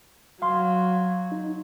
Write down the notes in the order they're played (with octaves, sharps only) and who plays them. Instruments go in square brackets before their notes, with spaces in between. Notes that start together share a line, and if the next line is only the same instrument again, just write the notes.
[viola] F#3 [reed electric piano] F5 C6
[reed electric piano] D#4